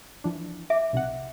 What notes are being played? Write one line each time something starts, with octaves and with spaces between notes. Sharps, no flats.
E3 F3 D4
E5 D6
B1 C3 F#5